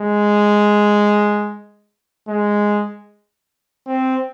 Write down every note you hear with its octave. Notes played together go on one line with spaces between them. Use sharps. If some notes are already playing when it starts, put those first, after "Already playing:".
Already playing: G#3
G#3
C4